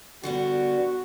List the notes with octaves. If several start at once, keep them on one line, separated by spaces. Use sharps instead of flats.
D3 G3 B3 F#4